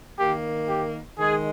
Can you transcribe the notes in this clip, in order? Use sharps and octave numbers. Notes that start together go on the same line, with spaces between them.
D#3 A#3 G4
G4
D#3 G#3 G#4